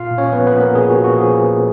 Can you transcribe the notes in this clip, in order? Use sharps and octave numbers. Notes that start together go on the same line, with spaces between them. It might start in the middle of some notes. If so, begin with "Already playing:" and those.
Already playing: A#2 F4 F5
A#2
C#4 C#5
F3 B3 B4
B3 B4
F3
A#3 A#4
A#2 G#4
F#4
A#2
F#4
F3 G#4